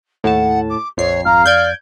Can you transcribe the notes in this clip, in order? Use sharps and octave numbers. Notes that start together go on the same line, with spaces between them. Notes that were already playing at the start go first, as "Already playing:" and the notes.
D#2 A2 F#5 A5
D6
A#1 F2 C#5 C7
G#1 F5 A#5
F2 D5 G6 G#6 D7